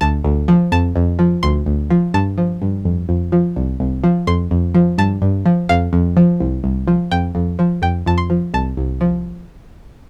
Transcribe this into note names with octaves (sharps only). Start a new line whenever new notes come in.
D2 A5
D2
F3
F2 A5
F2
F3
D2 C6
D2
F3
G2 A5
F3
G2
F2
F2
F3
C2
C2
F3
F2 C6
F2
F3
G2 A5
G2
F3
F2 F5
F2
F3
C2
C2
F3
F2 G5
F2
F3
F2 G5
F2 A5
C6
F3
C2 A5
C2
F3